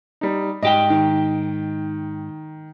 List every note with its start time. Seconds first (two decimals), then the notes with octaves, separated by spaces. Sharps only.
0.21 G3 D#4
0.63 G#2 G4 D#5 G5
0.90 D#3